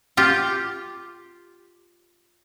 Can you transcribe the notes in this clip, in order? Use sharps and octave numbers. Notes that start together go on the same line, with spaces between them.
F4 G4